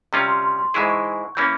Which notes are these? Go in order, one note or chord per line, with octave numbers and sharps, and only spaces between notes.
C3 G3 C#4 F4 A#5
C6
C6
C6
G#2 E3 G#3 E4 G#4 C#6
C#6
C#6
E3 A#3 C#4 G6